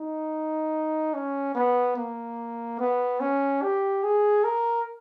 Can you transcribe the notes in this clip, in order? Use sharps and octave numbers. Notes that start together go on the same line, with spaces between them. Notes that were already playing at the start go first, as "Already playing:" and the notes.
Already playing: D#4
C#4
B3
A#3
B3
C#4
G4
G#4
A#4